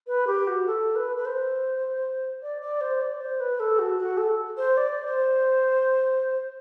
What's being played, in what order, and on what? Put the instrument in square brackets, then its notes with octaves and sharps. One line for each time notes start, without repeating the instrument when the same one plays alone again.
[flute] B4
G4
F#4
A4
B4
B4
C5
D5
D5
C5
D5
C5
B4
A4
F#4
F#4
A4
C5
D5
C5